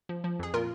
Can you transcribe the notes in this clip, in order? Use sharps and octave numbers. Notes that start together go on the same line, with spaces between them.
F3
F3
F2 G#4
A#2 F4 A#4